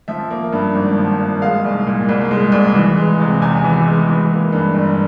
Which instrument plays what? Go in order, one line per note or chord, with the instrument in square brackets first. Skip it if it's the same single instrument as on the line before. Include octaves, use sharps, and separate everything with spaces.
[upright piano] F3 E5
A#3
G2
G#1
F3
A#3
G#3 F5
C2
A#2
C2
G#3
C2
E3
G#3
C3
E2 G#5
E3
G#3
E3
A#3
G2
G1